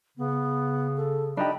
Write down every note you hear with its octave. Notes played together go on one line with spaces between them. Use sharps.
C#3 B3
A4
D4 D#4 G4 B5